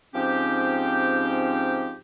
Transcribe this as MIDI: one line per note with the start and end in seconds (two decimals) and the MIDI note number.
0.15 1.95 44
0.15 1.95 53
0.15 1.95 60
0.15 1.95 61
0.15 1.95 63
0.15 1.95 67